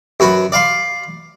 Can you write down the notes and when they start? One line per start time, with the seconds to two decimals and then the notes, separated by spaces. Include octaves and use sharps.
0.20 F#2 F#4 B4
0.52 D5 F5 C6